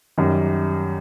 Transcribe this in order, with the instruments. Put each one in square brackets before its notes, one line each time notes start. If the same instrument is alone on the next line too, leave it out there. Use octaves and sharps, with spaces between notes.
[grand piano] F#2 D#3 G3